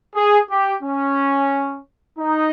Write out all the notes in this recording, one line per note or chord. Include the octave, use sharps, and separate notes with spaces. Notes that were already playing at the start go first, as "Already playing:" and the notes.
G#4
G4
C#4
D#4